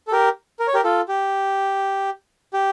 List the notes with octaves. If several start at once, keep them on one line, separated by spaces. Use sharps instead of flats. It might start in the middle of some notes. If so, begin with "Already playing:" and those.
A4
G4 A#4
A#4
C#5
G4 A#4
F4 A4
G4
G4